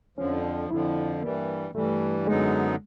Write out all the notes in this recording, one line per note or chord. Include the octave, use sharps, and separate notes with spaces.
F2 D3 F3 C#4
D4
F2 D3 F3 E4
G2 E3 G3 A#3
G2 E3 G3 A3
F#2 D3 F#3 G#3 B3 D#4